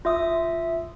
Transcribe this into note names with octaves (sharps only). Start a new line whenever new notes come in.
F4 E5 D#6